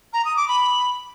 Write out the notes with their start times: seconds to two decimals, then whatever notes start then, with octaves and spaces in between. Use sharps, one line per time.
0.13 A#5
0.24 D#6
0.36 D6
0.48 B5